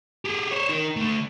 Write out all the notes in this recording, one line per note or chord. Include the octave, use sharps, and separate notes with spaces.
G4 G#4
C5 C#5
D#4 A#4
D3 A3